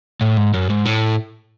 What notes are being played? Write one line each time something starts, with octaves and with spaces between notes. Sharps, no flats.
A2
G#2
F#2
G#2
A2